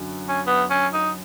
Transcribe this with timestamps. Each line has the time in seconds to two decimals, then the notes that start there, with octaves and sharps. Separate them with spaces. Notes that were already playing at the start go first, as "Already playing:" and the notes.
Already playing: F#2 D3 F#3
0.29 C#4
0.47 B3
0.70 C#4
0.93 D#4